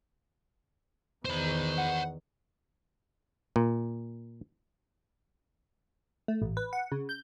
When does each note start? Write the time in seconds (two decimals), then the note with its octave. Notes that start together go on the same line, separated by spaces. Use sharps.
1.25 E2 D#3 C5 B5
1.77 F#5
3.56 A#2
6.28 A3
6.42 A1
6.57 B4
6.73 F#5
6.92 C#3
7.09 G6